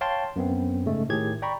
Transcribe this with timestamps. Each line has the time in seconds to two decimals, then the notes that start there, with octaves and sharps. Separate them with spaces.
0.01 C#5 F5 G5 A5 C6
0.36 F#2 B3 C4
0.85 G#2 C#3 G#3 A3
1.09 A2 D#3 G4 G#4 G#6
1.42 D5 G5 A#5 B5 C#6